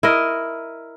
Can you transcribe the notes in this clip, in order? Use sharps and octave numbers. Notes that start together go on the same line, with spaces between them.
E4 A#4 D#5